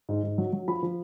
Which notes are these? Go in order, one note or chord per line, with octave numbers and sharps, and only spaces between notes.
G#2
G#2
F#3
F#3
F3 B5
F3